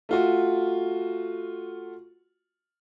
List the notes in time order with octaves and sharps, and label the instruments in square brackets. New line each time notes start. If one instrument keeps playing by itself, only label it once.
[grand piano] A3 F4 F#4